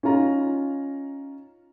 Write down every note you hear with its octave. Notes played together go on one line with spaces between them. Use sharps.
C#4 D#4 F4 A#5